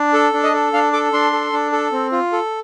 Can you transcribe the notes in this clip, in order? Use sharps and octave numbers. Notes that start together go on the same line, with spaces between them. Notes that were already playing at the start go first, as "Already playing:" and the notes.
Already playing: D4
A4
D4
D#5
A4
D4 F5
A4 D6
D4 C6
A4
D4
A4
C4
F4
A4